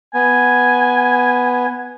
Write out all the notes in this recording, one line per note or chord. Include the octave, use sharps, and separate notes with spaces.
B3 G#5